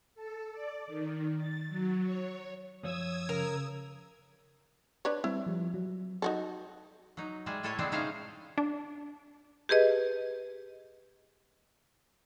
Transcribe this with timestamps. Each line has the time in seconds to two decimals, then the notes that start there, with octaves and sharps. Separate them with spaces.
0.15 A4
0.52 D5
0.87 D#3
1.37 A6
1.69 F#3
2.02 C#5
2.83 F#2 F3 C#5 D#6 E6 G#6
3.29 C#3 A#4
5.05 D4 B4 C#5
5.24 G3 C4 E4
5.46 F3 G3
5.74 F#3
6.22 D#4 F#4 A4
7.17 F#3 D#4
7.46 G3 G#3 G#4 E5
7.63 A2 E4 A4 C#5 G#5 A5
7.79 D3 G#3 B3 C4 D4
7.92 C3 C#4 D#4 G#4 C5 F5
8.58 D4
9.69 G4 G#4 B4 D#5